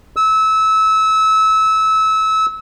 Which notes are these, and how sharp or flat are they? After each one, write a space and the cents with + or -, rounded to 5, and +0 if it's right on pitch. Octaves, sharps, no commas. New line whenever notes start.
E6 -25